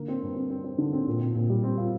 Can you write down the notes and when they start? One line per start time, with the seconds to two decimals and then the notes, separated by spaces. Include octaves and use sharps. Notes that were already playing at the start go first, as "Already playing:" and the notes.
Already playing: D3 A#3
0.08 C4
0.22 G2
0.36 C4
0.50 C4
0.64 C4
0.78 D3
0.93 C4
1.07 A#2
1.20 C4
1.35 A#2
1.49 G3
1.63 C4
1.78 F4